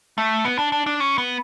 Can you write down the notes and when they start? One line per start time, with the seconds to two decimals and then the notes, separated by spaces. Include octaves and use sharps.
0.18 A3
0.45 B3
0.59 D4
0.72 D4
0.86 D4
1.00 C#4
1.18 B3